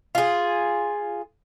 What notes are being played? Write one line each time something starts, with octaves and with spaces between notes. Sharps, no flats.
F4 G#4